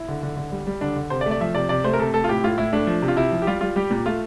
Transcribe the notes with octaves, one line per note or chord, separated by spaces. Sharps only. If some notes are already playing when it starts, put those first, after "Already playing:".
Already playing: E4
D3
D3
D3
G3
G3
D3 D4
D3
C3 C5
D5
A3
D5
F3 E5
C3 D5
C3 D5
A3 C5
A#4
C3 A4
A3 A4
F4
A2 G4
A2 F4
A2 E4
A3 D4
F3
C3
F4
C3 E4
F3
G4
G3 F4
G3 F4
G3 G4
A#2
A3 F4